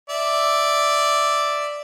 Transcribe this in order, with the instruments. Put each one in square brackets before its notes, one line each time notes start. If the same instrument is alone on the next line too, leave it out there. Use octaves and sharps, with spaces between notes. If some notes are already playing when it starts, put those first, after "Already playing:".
[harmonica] D5 E5